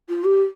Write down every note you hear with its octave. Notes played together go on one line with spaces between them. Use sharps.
F4
G4